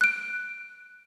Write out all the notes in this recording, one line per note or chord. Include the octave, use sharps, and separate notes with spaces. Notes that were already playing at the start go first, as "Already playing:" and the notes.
F#6 D7